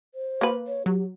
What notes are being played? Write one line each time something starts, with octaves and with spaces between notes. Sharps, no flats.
C5
A#3 B4
C#5
F#3 G4